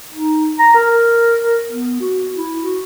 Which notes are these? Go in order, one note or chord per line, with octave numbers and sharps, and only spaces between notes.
D#4
A#5
A#4
B3
F#4
E4
F#4